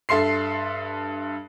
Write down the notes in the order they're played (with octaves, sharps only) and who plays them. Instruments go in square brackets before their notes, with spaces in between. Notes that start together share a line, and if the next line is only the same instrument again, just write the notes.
[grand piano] G2 A4 E5 C6 C7